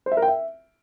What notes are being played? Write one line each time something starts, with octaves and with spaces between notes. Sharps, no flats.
C5
E5
A#4
G5
E5